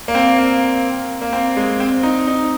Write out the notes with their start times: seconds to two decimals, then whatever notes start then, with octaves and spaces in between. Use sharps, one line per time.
0.08 A#3
0.15 C4
0.38 A#3
1.22 A#3
1.33 C4
1.57 G#3
1.80 C4
2.03 D#4
2.27 D#4